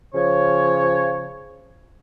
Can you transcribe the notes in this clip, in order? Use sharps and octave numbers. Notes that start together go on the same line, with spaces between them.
C#3 F3 C#5